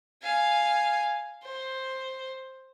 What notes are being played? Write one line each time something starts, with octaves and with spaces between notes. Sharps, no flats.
F5 G#5
C5